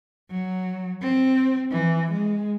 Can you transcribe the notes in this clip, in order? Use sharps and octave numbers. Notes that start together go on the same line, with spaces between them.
F#3
C4
E3
G#3